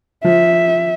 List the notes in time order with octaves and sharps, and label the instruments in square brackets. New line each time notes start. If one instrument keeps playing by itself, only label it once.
[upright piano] F3 [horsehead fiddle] E5